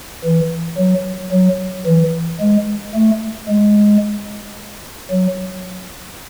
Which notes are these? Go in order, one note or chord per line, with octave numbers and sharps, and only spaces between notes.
E3
F#3
F#3
E3
G#3
A3
G#3
F#3